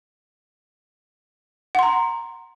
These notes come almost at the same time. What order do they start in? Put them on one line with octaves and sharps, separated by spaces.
F#5 C6 A#5